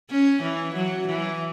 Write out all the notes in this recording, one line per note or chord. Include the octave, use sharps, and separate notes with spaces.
C#4
E3
F#3
E3